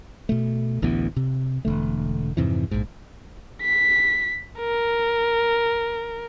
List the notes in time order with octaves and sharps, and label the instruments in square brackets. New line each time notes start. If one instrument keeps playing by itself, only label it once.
[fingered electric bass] B2 A3
A1 D2 E3 B3
C3
E1 D3 A3
F2 G#2 C3 E3
A#1 G#2
[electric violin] B6
A#4